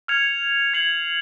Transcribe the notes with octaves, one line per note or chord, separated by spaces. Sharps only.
F6 G#6 C#7 F7
G#6 C7 F#7